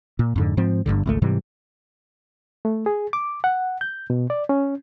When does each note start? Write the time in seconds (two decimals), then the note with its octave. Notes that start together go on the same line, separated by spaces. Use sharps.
0.19 A#2
0.36 F2 G#2 D3
0.57 G#2 F3 C4
0.86 G1 C#2 G2 D3
1.06 G#1 C#2 A3
1.22 G#2 C3 E3 G3
2.65 A3
2.86 G#4
3.13 D6
3.44 F#5
3.81 G6
4.10 B2
4.30 D5
4.49 C#4